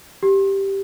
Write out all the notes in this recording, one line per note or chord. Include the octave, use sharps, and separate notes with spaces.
G4